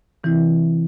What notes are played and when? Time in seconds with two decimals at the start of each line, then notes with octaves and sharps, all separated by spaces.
0.24 C3 E3 C4 E4